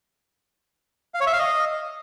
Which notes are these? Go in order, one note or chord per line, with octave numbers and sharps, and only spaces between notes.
F5
C#5
E5
F5
D#5